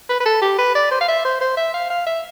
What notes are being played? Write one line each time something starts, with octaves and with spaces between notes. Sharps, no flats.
B4
B4
A4
G4
B4
D5
C5
F5
E5
C5
C5
E5
F5
F5
E5